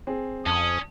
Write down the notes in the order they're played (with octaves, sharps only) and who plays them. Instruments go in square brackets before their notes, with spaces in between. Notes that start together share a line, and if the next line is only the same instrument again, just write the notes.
[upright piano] C4 G#4
[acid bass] F2 [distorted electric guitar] C#4 [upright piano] A5 [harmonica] D#6